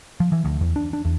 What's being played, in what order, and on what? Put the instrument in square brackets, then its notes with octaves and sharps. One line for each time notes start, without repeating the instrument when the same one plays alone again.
[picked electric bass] F3
E3
D2
E2
D4
D4
E2